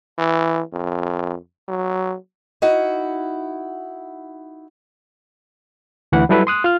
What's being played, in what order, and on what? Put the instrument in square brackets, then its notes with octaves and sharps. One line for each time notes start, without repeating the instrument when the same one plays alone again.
[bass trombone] E3
F2
F#3
[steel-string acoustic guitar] D#4 E4 F#4 F#5
[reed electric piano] D2 E3 F#5 B5
F#3 G3 E4 A4 B4
C6 D#6 F#6
F4 F6